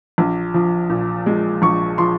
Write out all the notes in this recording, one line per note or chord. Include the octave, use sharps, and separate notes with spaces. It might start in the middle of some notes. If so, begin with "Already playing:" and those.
A#1
F3
A#2
G#3
A#1 C#6
F3 C6